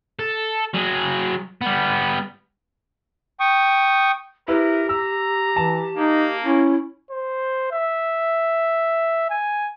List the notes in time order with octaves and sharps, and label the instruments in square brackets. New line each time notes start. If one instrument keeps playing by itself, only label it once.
[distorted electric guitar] A4
F#3 G#4
G3 B3
[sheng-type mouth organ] G5 C#6 D#6
[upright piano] E4 B4 [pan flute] G4 [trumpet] A#4
[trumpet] A#5 [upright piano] E6
[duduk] E3 [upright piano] A5
[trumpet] A#3 [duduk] D#4
[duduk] C#4 [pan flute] E4
[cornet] C5
E5
G#5